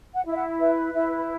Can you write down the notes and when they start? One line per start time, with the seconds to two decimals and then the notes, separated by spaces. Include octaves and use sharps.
0.13 F#5
0.25 E4
0.31 E5
0.36 F#5
0.60 B4 E5
0.94 E4 E5